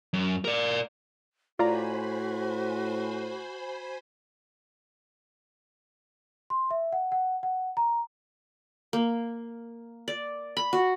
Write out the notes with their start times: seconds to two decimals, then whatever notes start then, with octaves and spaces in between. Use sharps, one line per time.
0.13 F#2
0.45 A#4 D5
1.59 A2 F4 F#4 C5 D5 G#5 A#5 B5
6.50 C6
6.71 E5
6.93 F#5
7.12 F#5
7.43 F#5
7.77 A#5
8.93 A#3
10.08 D5
10.57 B5
10.73 F#4